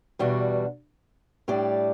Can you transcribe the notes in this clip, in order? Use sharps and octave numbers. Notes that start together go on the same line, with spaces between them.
E2 B2 G3 D4 F#4
A2 G3 D4 G4 D5